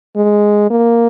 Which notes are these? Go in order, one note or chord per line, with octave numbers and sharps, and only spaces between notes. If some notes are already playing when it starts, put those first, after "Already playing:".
G#3
A#3